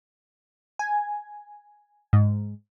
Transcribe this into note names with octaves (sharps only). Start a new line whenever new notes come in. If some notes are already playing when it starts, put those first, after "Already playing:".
G#5
G#2